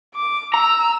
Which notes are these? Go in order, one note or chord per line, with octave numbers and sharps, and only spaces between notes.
D6
A#5 E6